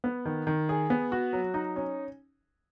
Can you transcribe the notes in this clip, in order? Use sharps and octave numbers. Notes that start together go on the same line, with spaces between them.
B3
D#3
D#3
G#4
B3
F#4
F#3
D#4
C#4